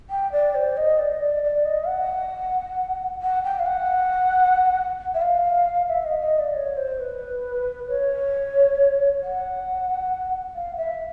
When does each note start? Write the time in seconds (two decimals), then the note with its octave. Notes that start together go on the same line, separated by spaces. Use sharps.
0.10 G5
0.32 D5
0.55 C5
0.77 D#5
0.99 D5
1.21 D5
1.43 D5
1.65 D#5
1.87 F#5
3.22 F#5
3.44 G5
3.59 F5
3.66 F#5
5.14 E5
5.22 F5
5.88 E5
6.05 D#5
6.21 D#5
6.39 D5
6.54 C#5
6.77 C5
7.00 B4
7.89 C#5
9.22 F#5
10.55 F5
10.77 E5